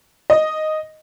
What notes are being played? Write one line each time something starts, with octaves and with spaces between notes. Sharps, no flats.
D#5